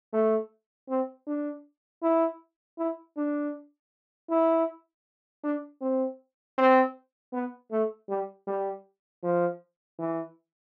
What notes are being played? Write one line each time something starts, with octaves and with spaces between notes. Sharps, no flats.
A3
C4
D4
E4
E4
D4
E4
D4
C4
C4
B3
A3
G3
G3
F3
E3